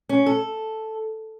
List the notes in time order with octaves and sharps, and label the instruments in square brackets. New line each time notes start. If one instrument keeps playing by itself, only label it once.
[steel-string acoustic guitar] C#4
A4